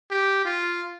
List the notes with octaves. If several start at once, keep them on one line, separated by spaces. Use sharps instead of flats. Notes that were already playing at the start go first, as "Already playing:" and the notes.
G4
F4